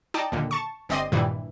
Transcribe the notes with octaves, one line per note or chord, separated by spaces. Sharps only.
D#4 D5 G5 A5
D#2 A#2 D3
A5 C#6
G1 C4 D5 D#5 C6 D#7
A#1 G2 A#2 D#3 E3 G3